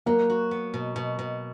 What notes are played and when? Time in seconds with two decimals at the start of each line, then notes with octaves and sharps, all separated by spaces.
0.06 F#3 A#3
0.30 F#4
0.51 B3
0.74 B2
0.96 B2
1.19 B2